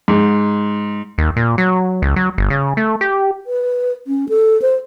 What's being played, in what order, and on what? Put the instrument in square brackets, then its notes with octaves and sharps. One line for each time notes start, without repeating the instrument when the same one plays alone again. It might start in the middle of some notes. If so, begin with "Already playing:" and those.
[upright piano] G#2
[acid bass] D#2
A#2
F#3
C#2
F#3
G1
C#3
A3
G4
[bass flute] B4
C#4
A4
C5